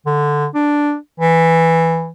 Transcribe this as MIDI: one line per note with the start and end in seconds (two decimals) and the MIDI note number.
0.06 0.47 50
0.55 0.96 62
1.20 2.11 52